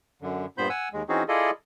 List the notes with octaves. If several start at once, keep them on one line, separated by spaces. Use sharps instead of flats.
F#2 D3
G2 A#2 B3 C5 B5 G6
F#5 G#5 E6
D#2 G#3
E3 C4 C#4 D#4 F#4 G#4
E4 F4 G#4 A4 D5 D#5